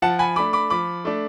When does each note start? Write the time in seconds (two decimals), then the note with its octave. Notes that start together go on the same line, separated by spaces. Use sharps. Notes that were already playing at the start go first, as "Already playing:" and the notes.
0.02 F3 F#5 A5
0.19 G#5 B5
0.36 A3 D4 B5 D6
0.53 B5 D6
0.70 F3 B5 D6
1.05 A3 D4